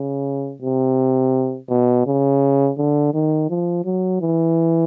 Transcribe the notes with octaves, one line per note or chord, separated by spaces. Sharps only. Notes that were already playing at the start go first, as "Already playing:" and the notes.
Already playing: C#3
C3
B2
C#3
D3
D#3
F3
F#3
E3